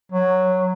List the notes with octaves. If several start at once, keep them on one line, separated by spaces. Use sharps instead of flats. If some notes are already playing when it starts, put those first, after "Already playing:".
F#3